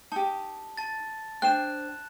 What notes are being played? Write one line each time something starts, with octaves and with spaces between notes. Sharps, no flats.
D#4 G4 A5
A5 A6
D4 C5 G5 F#6 E7